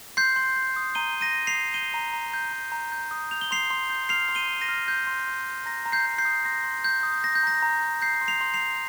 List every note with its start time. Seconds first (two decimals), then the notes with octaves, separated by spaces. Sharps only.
0.17 C6 G6 C7
0.36 C6
0.56 G6
0.76 D#6
0.95 A#5 D#7 G7
1.15 A#5
1.21 A#6 D#7
1.35 G6
1.47 C7 F7
1.55 D#6
1.74 G6 D#7 G7
1.94 A#5
2.13 A#5
2.34 G6
2.53 A#5
2.72 A#5
2.92 G6
3.11 D#6
3.31 G6 F7
3.41 G7
3.51 C6 C7 F7
3.70 C6
3.90 G6
4.09 F6 C7 F7
4.29 C6
4.35 D#7 G7
4.48 C6
4.61 A#6 D#7
4.69 F6
4.88 F6 G6
5.07 C6
5.27 C6
5.46 F6
5.66 A#5 A#6
5.86 A#5
5.92 G6 C7
6.06 G6
6.18 G6 C7
6.25 D#6
6.45 C6 A#6
6.64 C6
6.84 G6
7.03 D#6
7.24 G6 A#6
7.35 G6
7.43 A#5 A#6
7.63 A#5
7.82 G6
8.02 G6 C7
8.21 C6
8.28 C7 F7
8.41 C6
8.54 C7 F7
8.61 G6